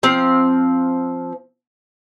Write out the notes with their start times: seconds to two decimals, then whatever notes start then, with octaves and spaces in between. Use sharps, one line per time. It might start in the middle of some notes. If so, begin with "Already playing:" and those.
0.03 F3 C4 F5